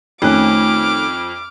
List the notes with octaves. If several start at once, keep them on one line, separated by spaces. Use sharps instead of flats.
F2 D#3 A3 C#4 D6 F6 F#6